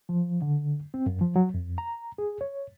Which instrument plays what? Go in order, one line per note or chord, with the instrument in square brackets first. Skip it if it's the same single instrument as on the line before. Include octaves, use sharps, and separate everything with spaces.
[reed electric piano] F3
D3
C4
F#2
F3
F#3
F2
A#5
G#4
C#5